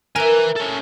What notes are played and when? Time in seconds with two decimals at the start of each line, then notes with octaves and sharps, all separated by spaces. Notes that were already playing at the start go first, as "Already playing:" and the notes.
0.16 A#4 B4 E5 G#5
0.57 C#4 A4